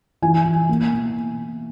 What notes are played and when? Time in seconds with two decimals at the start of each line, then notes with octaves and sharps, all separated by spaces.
0.22 E3 G#5
0.45 E3
0.69 A#3
0.92 B2